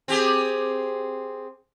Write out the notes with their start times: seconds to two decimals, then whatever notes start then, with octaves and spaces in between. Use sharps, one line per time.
0.08 C4 G4 G#4